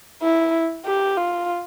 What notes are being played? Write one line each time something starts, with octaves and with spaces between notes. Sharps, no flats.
E4
G4
F4